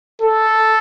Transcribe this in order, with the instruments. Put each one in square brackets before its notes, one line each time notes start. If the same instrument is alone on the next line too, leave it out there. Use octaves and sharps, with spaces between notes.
[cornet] A4